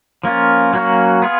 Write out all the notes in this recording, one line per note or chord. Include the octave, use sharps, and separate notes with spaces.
F3 A#3 C#4 F4
F#3 A#3 C#4 F#4
B3 F4 G#4